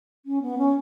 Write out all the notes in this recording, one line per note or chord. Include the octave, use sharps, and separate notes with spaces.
C#4
B3
C#4